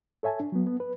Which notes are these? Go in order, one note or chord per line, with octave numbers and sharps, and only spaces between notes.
A4 C#5 E5 G#5 A5
D4
F#3 B3
B3
B4